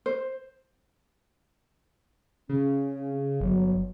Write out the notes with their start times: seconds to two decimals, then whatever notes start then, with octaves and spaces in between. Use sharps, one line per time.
0.06 C5
2.49 C#3 C#4
3.40 G1 F#3